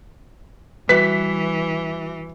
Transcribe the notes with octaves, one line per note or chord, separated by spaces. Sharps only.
E3 G3 F#4 B4 E5 B6